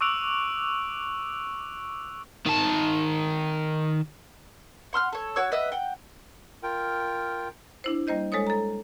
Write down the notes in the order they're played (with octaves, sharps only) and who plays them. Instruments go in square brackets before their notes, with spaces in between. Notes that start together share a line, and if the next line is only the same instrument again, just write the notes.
[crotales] C#6 D6 E6 F#6 D7 F7
[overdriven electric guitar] D#3 A5
[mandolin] F#5 C6 E6 F6
A4 C#5
F#4 C#5 E6
B4 D#5 E5 F#5
F#5 G5
[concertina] F4 A#4 G5
[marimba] D4 E4 C5
G3 A#3 C5 D#5 G6
G#3 A4 C5 C#5 D#6
A4 A#5